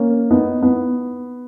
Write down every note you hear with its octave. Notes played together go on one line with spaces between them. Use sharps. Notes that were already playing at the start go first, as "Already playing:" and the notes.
Already playing: A#3 C#4
B3 D#4
B3